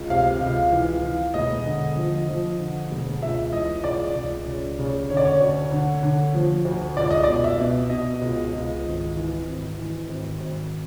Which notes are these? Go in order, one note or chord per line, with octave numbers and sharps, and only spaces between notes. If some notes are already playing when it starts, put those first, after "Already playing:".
Already playing: C#2
C3 F5
C#2
E3
E3
E1 D#5
D3
F3
F3
D3
E1
C#2 E5
E3 D#5
C#2 D5
C#2
C#3
C#3
D3 C#5
D5
C#5
D2
D3
D3
F3
D2
C#2 D5
D#5
B2 D5
E5
B2
B2 D#5
C#2
C#2
G#1
E3
G#1
E3
G#1
G#1